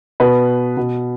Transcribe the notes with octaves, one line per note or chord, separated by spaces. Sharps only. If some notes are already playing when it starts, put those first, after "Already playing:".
B2 B4
B2